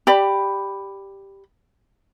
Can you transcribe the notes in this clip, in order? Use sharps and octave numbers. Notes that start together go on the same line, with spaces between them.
G4 D5 B5